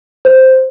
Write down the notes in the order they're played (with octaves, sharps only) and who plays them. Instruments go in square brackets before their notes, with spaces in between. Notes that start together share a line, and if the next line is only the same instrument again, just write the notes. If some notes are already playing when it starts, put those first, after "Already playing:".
[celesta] C5